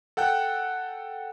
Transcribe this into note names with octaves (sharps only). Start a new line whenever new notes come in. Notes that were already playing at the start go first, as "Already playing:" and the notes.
A4 F#5 G5 F#6